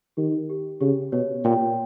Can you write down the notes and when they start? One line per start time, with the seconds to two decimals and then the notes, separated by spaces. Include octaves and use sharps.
0.17 D#3 G4
0.50 G4
0.80 C#3 G4
1.12 B2 C#5
1.45 A#2 G5